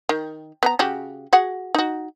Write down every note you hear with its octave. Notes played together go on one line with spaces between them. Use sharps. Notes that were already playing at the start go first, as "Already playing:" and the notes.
D#3
B3 B4 A#5
C#3 F#4 G4
F#4 G#4 F#5
D#4 F#4